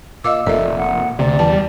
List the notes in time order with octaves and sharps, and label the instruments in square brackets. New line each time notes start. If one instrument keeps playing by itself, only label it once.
[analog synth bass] A#2 [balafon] D#5 F5 D6 [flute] E6
[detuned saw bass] F1 [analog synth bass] A#2 [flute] A4 [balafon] D5 E5
[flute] F#5
[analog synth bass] D2 [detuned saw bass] C3 [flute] D5
[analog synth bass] E2 [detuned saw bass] G3 [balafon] A5